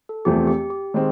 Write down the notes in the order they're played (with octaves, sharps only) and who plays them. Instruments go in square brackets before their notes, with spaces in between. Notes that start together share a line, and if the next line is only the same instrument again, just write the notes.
[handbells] A4
[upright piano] E2 C3 F3 A3 C4 [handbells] G4
[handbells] G4
G4
[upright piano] D#3 G#3 C4